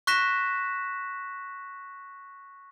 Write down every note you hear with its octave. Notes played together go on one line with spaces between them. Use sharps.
C#6 F#6 A#6 B6 E7